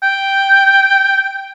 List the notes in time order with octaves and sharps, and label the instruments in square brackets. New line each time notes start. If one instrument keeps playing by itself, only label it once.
[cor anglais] G5